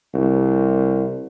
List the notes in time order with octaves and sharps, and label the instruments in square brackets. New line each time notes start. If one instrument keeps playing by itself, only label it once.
[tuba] C2